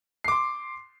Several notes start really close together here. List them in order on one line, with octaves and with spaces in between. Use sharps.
C7 D6 C6